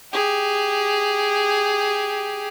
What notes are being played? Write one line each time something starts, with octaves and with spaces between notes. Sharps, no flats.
G4 G#4